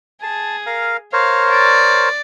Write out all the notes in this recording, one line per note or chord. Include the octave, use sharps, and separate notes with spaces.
G#4 A5
A#4 F5
A#4 C5 C#5 F5
D5